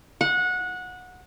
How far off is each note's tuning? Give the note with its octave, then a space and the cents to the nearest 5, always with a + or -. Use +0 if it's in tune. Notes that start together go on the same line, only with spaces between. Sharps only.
F#5 -20